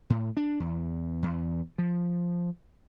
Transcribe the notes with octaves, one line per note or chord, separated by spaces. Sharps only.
A2
D4
E2
E2
F3